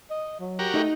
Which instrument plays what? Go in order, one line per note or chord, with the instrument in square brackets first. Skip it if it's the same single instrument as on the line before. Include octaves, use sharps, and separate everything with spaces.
[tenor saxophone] D#5
F#3
[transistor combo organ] F#4 G4 A#4
[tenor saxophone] A3 [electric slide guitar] D#4 D#5